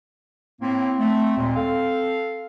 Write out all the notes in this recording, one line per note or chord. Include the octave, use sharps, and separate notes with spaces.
A2 A#3 C4
A3
D#2 A#2 G#3
A4 F5